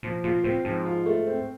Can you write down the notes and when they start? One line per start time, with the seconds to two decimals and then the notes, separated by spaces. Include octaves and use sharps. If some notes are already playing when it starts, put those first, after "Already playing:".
0.03 A#2 F3
0.24 A#2 F4
0.44 A2 C4
0.65 G#2 F3
0.85 F4
1.06 A3
1.27 C4